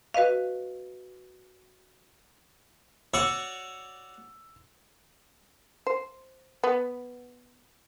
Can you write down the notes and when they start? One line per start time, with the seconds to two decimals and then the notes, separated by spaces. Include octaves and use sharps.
0.14 F#4 B4 D#5 F5
3.14 F#4 C#5 D5 E6
5.87 C5
6.64 B3